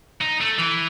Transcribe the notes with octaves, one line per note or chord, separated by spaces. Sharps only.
D#4
A3
E3